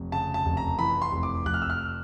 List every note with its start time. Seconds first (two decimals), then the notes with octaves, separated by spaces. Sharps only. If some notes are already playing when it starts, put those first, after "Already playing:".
Already playing: F1
0.12 C#3 A5
0.34 A5
0.46 F1
0.57 A#5
0.79 E3 B5
1.02 C6
1.12 F1
1.23 D6
1.45 F1 F#6
1.54 F6
1.62 E6
1.70 F6